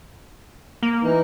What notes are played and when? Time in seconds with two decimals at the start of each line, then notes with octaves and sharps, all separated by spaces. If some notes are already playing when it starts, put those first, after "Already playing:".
0.83 A#3
1.03 E3 D#4